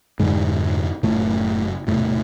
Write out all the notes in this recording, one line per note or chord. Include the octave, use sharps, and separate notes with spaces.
F1 F2 G#2 D3 G#3
F#1 F#2 A2 C#3 A3
E1 E2 A2 C3 A3